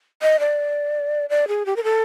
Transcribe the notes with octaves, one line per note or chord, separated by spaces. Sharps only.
D#5
D5
D5
G#4
G4
A#4
A4